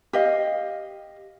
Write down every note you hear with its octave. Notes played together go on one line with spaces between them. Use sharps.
G4 D#5 F5